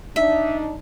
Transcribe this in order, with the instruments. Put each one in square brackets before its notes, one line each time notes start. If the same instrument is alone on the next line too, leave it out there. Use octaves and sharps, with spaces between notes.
[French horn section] D4 D#4 [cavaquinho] E5